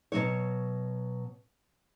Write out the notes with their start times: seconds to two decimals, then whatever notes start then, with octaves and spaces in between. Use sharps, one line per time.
0.12 B2 F#3 C#5